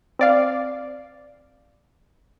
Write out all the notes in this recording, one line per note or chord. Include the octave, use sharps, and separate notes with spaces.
C4 D5 F5